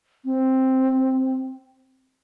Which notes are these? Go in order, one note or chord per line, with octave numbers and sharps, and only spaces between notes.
C4